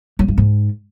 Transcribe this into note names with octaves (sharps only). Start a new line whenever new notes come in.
F#3
G2
G#2